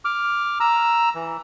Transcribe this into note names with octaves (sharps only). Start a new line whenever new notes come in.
D6 F6
A#5 E6
E3